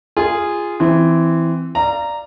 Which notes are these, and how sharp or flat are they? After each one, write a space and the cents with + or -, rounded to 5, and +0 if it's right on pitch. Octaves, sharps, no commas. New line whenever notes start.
F4 -15 G#4 -10
E3 +0 C4 -15
D5 +5 F5 -30 A#5 -5